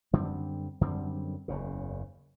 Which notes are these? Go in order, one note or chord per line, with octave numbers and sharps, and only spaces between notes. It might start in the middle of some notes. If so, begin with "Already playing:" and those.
F#2 D3 G3 C4
F#2 D3 G3 C4
F#1 E2 C#3